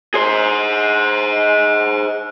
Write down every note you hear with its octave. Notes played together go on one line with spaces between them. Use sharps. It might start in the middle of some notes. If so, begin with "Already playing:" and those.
G#4 C5